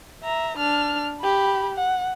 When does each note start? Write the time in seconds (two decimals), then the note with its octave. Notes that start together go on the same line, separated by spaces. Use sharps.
0.23 E5 A#5
0.57 D4 F6
1.21 G4 B5
1.75 F#5